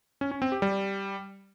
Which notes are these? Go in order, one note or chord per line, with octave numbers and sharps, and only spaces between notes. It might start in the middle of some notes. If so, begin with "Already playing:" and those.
C#4
C#4
C4
G4
G3